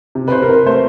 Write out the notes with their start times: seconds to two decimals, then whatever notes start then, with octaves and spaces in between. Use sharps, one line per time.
0.15 C3
0.28 B4
0.32 C3 C5
0.42 A#4
0.49 C3 B4
0.66 A3 C5